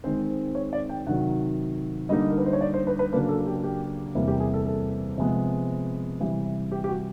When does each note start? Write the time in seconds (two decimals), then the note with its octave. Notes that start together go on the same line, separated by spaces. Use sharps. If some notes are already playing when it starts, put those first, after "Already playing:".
0.04 D#3 G#3 C4 C5
0.55 C#5
0.73 D5
0.89 G5
1.07 C3 D#3 F#3 F#5
2.09 D3 G3 A#3 D#4 D#5
2.30 A#4
2.38 B4
2.46 C5
2.53 C#5
2.61 D5
2.74 C5
2.87 B4
2.99 B4
3.13 C#3 F#3 A#3 D4 B4
3.29 A4
3.46 G4
3.64 G4
4.14 E2 C3 E3 G3 A#3
4.28 G4
4.40 G#4
4.54 A4
4.66 A4
5.18 C3 F3 G#3 B3
6.20 C3 E3 G3
6.72 G4
6.84 G4
6.89 F#4